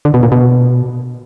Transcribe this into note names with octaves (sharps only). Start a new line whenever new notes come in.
D3
B2
A#2
B2